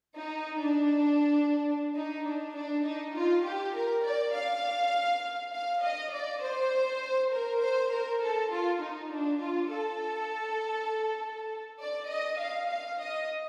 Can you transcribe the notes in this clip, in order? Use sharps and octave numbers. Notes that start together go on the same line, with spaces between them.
D#4
D4
D#4
D4
D4
D#4
F4
G4
A#4
D5
F5
F5
D#5
D5
C5
A#4
C5
A#4
A4
F4
D#4
D4
F4
A4
D5
D#5
F5
F5
D#5